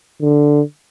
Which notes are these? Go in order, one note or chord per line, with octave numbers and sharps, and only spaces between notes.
D3